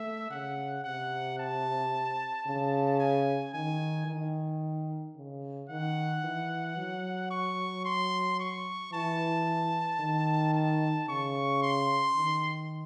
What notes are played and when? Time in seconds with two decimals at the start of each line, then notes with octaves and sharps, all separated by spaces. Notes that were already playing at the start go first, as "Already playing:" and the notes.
Already playing: A3 E5
0.30 C#3 F#5
0.84 C3 F#5
1.39 A5
2.47 C#3
3.00 G#5
3.54 D#3 G#5
4.07 D#3
5.16 C#3
5.69 D#3 F#5
6.24 E3
6.77 F#3
7.31 C#6
7.85 C6
8.40 C#6
8.93 E3 A5
10.00 D#3
10.54 A5
11.08 C#3 C#6
11.62 C6
12.16 D#3